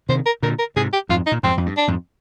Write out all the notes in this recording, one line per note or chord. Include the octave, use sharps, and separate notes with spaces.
C3 D#3 C5
A#4
A#2 D3 A#4
A#4
G#2 C3 G#4
G4
F2 G#2 F4
D#4
A#2
F2 G#2 C4
F2
G2
D4
F2 G#2